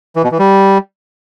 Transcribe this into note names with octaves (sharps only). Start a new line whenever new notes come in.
E3
B2
E3
G3